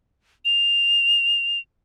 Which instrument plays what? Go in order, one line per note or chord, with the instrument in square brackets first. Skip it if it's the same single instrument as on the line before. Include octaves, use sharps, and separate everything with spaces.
[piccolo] F7